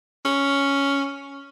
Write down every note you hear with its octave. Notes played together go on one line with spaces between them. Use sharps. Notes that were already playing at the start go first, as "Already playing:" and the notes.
C#4